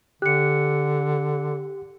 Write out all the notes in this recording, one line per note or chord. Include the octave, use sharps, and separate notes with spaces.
D3 G4 F#6 C#7